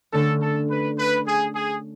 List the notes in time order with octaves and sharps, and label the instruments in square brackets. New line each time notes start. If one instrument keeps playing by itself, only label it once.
[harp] D3 A3 C#4 [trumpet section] A4
[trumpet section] A4
B4
B4
G#4
G#4